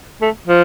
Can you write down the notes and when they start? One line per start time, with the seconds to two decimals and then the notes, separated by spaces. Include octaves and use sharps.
0.21 A3
0.48 F3